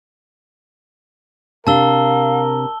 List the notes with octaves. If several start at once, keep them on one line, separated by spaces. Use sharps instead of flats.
C3 D4 A#4 F5 A5 E6 G7